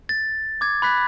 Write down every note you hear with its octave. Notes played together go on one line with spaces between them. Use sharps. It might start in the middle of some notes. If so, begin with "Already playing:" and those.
A6
D6 G#6
B5 F#6 B6